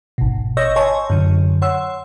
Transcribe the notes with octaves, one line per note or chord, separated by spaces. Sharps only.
G#1 B2
C#5 D#5 C#6 E6 G6 A#6
C#5 D#5 G#5 A5 C6 C#6
F#2 D3
C#5 F#5 C6 E6